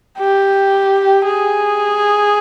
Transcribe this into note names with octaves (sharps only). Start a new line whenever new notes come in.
G4
G#4